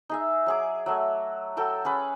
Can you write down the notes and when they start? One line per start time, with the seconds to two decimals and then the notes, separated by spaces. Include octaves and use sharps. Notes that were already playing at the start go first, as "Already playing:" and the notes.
0.09 D#4 G#4 E5
0.46 F#3 G#4 D6
0.86 F#3 A3
1.57 F#3 A4 G5 E6
1.85 C#4 G#4 B4